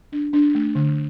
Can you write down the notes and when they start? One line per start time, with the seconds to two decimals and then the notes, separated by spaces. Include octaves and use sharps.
0.12 D4
0.33 D4
0.55 A3
0.75 D3